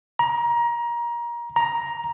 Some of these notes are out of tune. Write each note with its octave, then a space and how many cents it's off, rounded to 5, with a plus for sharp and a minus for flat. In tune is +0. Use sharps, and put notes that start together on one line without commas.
A#5 +25
A#5 +10